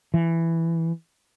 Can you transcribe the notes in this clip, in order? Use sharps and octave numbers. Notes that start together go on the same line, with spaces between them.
E3